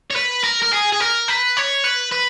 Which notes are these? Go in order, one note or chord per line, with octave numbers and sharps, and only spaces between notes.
C#5
B4
A#4
A#4
G#4
G#4
A#4
B4
C#5
B4
B4